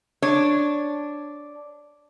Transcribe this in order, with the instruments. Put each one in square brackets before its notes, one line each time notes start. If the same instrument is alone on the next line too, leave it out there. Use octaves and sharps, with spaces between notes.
[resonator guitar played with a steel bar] D4 C#5